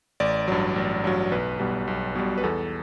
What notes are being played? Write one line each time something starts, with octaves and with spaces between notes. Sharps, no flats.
A1 D5
G2 F#3
A1
G2 F#3
B1 B4
B2 G3
B1
B2 G3
B4
E2 A4